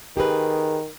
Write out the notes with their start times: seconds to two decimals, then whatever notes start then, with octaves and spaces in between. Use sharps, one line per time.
0.17 D#3 G4 G#4 B4